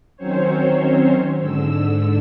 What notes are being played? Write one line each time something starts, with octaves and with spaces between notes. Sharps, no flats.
D#3 F#3 C4 C#4 C5 C#5
G#2 D3 E6